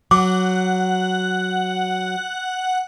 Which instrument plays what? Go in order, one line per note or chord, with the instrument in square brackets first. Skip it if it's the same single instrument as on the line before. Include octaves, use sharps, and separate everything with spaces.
[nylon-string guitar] F#3 [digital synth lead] F#5 [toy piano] D6